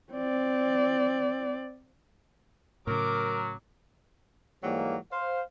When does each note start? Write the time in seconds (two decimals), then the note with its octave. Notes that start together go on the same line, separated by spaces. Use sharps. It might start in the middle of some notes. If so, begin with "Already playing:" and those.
0.13 C4 D5
2.87 A2 C#3 F#3 A#4 D6
4.63 G#2 E3 F#3 G3 A#3
5.11 C5 F5